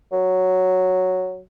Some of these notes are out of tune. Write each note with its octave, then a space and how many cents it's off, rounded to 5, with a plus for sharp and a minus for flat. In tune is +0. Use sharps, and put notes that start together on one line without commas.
F#3 +0